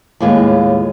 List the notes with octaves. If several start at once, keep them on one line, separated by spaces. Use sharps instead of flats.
D#2 A2 G#3 F4 B4